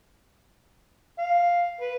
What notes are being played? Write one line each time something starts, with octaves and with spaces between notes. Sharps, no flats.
F5
B4